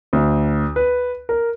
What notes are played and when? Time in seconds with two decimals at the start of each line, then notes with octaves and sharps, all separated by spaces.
0.13 D2
0.76 B4
1.29 A#4